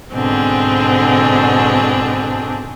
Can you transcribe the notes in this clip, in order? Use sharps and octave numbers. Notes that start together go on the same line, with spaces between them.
G#2 B2 D3 C4 D4 G#4